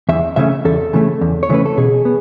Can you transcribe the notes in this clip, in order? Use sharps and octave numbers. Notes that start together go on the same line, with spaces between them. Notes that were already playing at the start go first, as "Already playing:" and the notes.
E2 E5
C#3 E3 A3 C#4 E5
E2 A4
C#3 E3 A3 C#4
E2
C#5
C#3 E3 A3 C#4 B4
A4
B2 G#4
B3